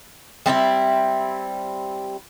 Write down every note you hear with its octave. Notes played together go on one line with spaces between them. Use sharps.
G3 C4 D#4 E4